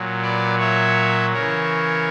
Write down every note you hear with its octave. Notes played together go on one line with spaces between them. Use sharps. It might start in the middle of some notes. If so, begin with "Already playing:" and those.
Already playing: A#2 F#3
B4 D5
C#5 E5
C#3 E3 A#4 C#5